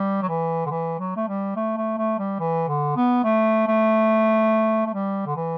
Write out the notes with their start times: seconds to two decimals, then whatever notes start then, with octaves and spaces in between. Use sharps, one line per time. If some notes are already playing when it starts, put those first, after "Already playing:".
Already playing: G3
0.22 F#3
0.29 E3
0.67 D3
0.71 E3
0.99 F#3
1.17 A3
1.28 G3
1.56 A3
1.77 A3
1.98 A3
2.19 G3
2.40 E3
2.68 D3
2.97 B3
3.24 A3
3.68 A3
4.86 A3
4.94 G3
5.26 D3
5.37 E3